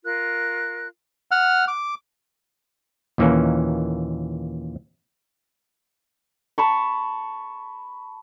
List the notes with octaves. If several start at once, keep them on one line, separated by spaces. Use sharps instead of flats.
F4 A#4 F#6
F#5 F6
D6
D#2 A#2 E3 A#3 C#4
A5 B5 C#6